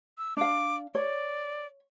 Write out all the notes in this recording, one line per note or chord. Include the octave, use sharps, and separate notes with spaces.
E6
D4 F5 D6
C#5 D5